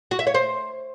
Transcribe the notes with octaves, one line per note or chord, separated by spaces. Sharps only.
F#4
E5
C#5
C5